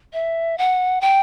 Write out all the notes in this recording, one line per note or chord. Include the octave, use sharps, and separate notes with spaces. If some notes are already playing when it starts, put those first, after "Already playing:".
E5
F#5
G5